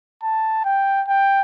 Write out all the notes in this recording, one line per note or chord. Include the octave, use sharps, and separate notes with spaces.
A5
G5
G5